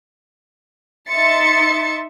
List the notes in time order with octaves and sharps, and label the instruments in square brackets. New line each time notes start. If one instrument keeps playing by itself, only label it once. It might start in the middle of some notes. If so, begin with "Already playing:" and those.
[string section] D#4 E5 C6 A6 C#7